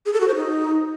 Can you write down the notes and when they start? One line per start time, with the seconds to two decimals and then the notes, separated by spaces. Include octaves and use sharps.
0.06 G#4
0.13 A4
0.20 F#4
0.28 C5
0.35 D#4